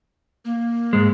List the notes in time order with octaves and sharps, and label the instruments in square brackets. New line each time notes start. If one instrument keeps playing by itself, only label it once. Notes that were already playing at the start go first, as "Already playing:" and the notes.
[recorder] A#3
[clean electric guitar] G#2 G#3